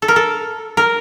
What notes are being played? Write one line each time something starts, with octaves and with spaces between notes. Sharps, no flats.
A4
A#4
A4
A#4